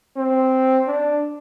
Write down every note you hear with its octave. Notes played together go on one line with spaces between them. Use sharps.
C4
D4